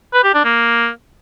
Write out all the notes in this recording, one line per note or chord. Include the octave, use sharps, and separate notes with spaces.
B4
G4
D4
A#3